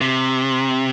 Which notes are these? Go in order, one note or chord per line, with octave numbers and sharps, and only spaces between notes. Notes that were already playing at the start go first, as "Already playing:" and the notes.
C3